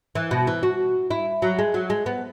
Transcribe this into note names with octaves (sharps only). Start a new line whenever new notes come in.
E3
B2
E3
F#4
E4
F#3
G#3
F#3
G#3
B3